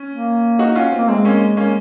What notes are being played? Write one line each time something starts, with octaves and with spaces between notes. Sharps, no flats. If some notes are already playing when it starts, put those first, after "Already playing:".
Already playing: C#4
A#3
D#4 F#4
C#4 F4
C4
A#3
G#3 C4
A#3 C#4
A#3 C#4